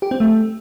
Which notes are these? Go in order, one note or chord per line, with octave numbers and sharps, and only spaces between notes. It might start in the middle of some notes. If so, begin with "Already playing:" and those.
G4
C4
A3